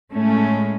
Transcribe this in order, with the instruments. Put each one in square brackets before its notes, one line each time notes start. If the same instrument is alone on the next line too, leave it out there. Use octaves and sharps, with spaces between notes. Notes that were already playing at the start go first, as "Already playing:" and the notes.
[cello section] A2 G#3 A3 C#4